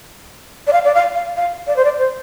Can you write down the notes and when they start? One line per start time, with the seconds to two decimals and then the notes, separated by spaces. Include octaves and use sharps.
0.67 D5
0.73 F5
0.84 D5
0.95 F5
1.15 F5
1.36 F5
1.67 D5
1.76 C5
1.84 D5
1.99 C5